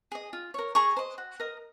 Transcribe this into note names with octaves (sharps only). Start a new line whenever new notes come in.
G#4 D#5
F4
A#4 C#5
G#4 A#5 C#6
C5 D#5
F#4
A#4 D#5